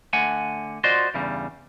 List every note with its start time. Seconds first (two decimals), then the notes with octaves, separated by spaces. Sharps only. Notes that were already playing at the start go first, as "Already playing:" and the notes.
0.13 D3 A3 F#5 G#5
0.84 F4 F#4 C5 D5 D#5
1.14 E2 G2 C#3 G3